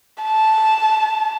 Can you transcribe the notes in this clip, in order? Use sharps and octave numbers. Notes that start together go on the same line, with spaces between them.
A5